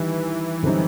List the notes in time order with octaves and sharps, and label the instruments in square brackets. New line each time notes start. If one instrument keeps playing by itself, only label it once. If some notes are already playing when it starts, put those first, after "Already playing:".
Already playing: [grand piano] D#3 G3 [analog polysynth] E3
[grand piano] F#2 D3 G3 C4 D#4